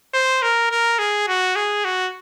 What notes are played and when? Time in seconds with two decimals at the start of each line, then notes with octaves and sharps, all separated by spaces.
0.14 C5
0.42 A#4
0.71 A#4
0.99 G#4
1.28 F#4
1.56 G#4
1.85 F#4